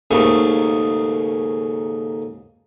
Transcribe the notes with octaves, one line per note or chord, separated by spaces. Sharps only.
D#2 G#2 C#3 A3 A#3